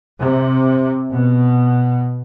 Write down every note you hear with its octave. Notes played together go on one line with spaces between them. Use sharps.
C3
B2